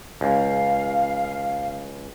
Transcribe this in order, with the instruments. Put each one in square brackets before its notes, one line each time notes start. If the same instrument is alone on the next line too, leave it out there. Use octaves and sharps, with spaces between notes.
[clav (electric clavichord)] C#2 [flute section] F5